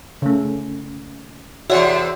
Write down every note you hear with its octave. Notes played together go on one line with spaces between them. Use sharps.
C#3 A3
E2 C3 F#4 C#5 D5 E5